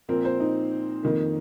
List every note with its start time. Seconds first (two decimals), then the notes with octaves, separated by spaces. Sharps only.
0.09 A#2 F3 C4 A#4
0.25 C5
0.40 D#4
1.03 F2 D#3 A#3